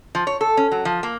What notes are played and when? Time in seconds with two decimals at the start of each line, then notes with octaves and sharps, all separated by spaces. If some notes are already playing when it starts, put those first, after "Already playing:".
0.15 F3
0.27 C#5
0.41 A4
0.57 C#4
0.71 F#3
0.85 F3
1.03 A#3